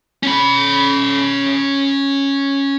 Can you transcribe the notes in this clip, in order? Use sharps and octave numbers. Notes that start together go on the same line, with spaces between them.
C#4 B5